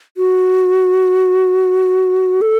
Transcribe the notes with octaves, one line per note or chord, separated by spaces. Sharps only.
F#4
A4